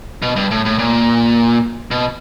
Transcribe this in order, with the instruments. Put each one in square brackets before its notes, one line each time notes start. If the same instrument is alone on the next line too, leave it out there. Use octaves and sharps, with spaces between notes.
[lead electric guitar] B2
G2
A2
A2
A#2
B2